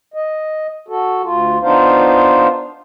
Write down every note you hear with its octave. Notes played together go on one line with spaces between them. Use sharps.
D#5
F#4 A4
D2 F4
B3 D4 D#4 F4 C5 F5